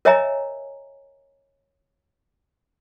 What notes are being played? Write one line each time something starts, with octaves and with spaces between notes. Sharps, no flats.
A#4 C#5 D#5 E5 G#5 A#5